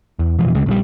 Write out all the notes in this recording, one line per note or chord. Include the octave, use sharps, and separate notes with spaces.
E2
F2 B2 E3 F3
D2 C#3 G#3
A#1 D3 G3